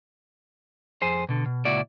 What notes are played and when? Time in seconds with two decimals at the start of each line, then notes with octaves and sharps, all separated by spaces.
1.02 F2 G#4 C5
1.29 B2 D3
1.46 B2
1.65 C#2 A#2 E4 F#4 D5